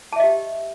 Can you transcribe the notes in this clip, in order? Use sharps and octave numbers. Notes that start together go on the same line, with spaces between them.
G4 D#5 E5 A5